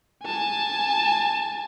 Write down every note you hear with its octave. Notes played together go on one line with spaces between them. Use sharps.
G#5 A5